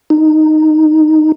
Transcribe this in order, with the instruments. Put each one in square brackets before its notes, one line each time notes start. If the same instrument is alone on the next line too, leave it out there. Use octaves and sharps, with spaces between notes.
[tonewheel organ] D#4